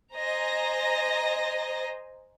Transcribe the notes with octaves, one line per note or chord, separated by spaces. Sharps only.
C5 D#5 G#5 A#5 A#6